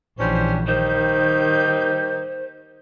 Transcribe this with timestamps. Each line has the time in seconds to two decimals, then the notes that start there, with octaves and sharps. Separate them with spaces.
0.18 A#1 E3 G3 C#4 D4 C5
0.67 D#3 G3 A#3 D#4 C5 G6